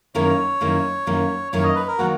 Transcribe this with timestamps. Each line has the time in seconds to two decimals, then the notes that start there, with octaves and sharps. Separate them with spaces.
0.15 F#2 D#3 A#3 E4 A#4 C#5
0.61 F#2 D#3 A#3 E4 A#4
1.07 F#2 D#3 A#3 E4 A#4
1.52 F#2 D#3 A#3 E4 A#4 C#5
1.64 D#5
1.75 B4
1.88 A#4
1.98 D#3 F#3 A#3 F#4